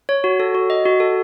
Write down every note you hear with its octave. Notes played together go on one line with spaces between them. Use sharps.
C#5
F#4
A4
F#4
D#5
F#4
A4